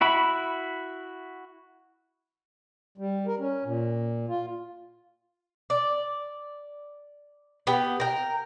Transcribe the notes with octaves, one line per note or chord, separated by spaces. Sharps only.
E4 F#4 E5 B5
G3
A#4
C#4
A#2
F4
D5
B3 G4
A#4 G5